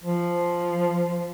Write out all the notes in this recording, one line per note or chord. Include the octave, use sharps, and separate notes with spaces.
F3